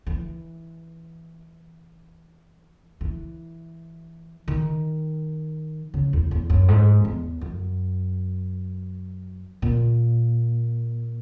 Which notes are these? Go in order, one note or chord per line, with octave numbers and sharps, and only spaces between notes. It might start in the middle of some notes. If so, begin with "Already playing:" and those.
E3
E3
D#3
C#3
E2
E2
F#2
G#2
E2
F#2
A#2